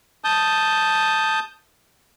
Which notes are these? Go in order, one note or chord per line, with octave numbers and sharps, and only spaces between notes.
A5 D#6 G6